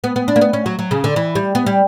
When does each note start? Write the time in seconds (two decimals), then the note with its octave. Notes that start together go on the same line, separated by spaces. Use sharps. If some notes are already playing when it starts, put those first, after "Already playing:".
0.04 B3
0.16 B3
0.28 D4
0.36 A#3
0.41 B3
0.53 C#4
0.66 F#3
0.79 F#3
0.91 C#3
1.04 D3
1.16 E3
1.35 G3
1.55 B3
1.67 G3